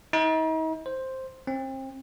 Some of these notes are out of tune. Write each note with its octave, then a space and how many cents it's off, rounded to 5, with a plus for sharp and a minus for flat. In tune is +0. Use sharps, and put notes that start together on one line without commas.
D#4 +40
C5 +5
C4 +30